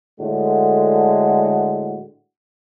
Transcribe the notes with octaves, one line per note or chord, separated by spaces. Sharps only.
A2 D3 G#3 F#4